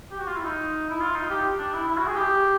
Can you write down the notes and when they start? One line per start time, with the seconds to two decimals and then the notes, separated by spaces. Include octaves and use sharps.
0.12 G4
0.20 F#4
0.28 F4
0.36 E4
0.44 D#4
0.90 E4
1.01 F4
1.15 D#4
1.30 G4
1.58 D4
1.74 E4
1.88 E4
1.97 F#4
2.07 G#4
2.16 G4